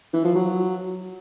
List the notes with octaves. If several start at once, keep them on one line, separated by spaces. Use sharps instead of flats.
E3
F3
F#3